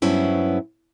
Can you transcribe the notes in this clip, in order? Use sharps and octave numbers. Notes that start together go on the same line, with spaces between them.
G2 F#3 B3 C#4 E4 C5